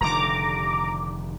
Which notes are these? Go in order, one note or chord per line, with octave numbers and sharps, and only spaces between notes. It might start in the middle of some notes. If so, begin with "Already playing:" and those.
F1 D3 D#3 A#5 D6